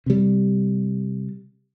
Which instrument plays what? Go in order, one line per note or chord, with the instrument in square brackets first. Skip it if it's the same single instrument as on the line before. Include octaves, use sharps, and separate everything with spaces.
[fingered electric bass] C3 G3